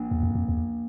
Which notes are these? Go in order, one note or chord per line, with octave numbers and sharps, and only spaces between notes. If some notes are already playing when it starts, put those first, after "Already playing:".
Already playing: A#3 D4
E2
F2
F2
E2